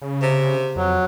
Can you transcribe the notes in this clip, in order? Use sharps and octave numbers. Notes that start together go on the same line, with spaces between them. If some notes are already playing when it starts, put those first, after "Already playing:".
C#3
C3
F2 F#3